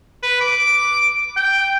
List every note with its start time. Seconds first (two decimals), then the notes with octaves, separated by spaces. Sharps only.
0.23 B4
0.41 D6
1.37 G5